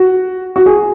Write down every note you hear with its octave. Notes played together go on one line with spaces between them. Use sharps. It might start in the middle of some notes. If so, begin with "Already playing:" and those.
Already playing: F#4
F#4
G#4